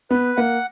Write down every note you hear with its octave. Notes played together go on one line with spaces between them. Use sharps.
B3 B4
A#3 F#5